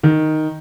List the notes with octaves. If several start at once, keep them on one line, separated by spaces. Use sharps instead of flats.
D#3